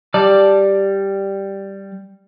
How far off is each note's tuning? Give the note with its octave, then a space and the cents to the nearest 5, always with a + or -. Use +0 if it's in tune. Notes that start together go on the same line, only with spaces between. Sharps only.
G3 +0 D5 +5 A5 +0